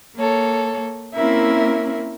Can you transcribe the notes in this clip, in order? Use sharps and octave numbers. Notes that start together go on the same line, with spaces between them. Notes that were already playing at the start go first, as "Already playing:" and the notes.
A#3 A4 C#5
A#3 C4 C#4 E4 A#4 E5